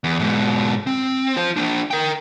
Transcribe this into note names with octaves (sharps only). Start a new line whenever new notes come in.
E2
G#2 B2
C4
F4 C5
A#3 D4
A#4 G5